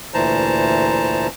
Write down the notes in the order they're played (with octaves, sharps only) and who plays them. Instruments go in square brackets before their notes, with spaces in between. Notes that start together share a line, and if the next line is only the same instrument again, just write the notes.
[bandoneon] D2 A#2 E3 C5 A5 A#5